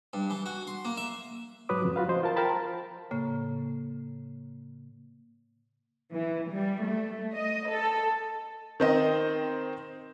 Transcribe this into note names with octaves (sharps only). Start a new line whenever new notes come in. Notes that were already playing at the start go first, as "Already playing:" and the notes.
G2
E3
F#4
C6
A#3
E5
G#2 F#3 B4 C#5 D6 D#6
F2 C#3 F3
F4 F#4 B4 F5
F3 C5 D#5
F4 A#4 A5
A#4 C5 F5 G5 A5 B5
A2 C#3 A#3
E3
G3
A3
D#5
A4
D#3 C4 D#5